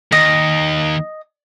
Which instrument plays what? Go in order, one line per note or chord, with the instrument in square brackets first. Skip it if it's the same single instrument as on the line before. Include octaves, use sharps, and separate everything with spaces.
[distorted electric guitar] D#2 [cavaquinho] D#5